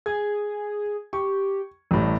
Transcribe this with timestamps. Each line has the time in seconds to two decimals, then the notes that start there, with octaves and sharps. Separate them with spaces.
0.06 G#4 G#6
1.13 G4 C#6
1.91 A1 A2 G3